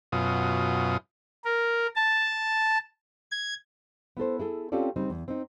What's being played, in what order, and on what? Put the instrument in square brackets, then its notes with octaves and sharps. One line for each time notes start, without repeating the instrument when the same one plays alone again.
[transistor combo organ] F#2 B2 F4 D#6
[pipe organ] A#4
A5
G#6
[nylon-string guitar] B3 E4 A4 C5
E4 G#4 A4
C4 C#4 F4 G4 A4 D5
C#3 G3 C4 D#4
E2
C4 D#4